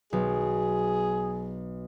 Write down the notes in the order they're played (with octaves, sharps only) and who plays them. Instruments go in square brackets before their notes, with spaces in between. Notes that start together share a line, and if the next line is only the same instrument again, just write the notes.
[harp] B1 [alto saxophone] G#4